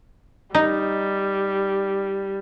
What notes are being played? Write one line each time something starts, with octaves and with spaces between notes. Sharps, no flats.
G3 D#4